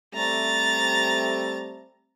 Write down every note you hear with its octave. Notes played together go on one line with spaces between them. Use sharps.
G3 A3 C4 A#5 A6